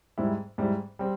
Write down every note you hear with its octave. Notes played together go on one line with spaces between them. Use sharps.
G#2 G3 C4 E4
G#2 G3 C4 E4
G3 C4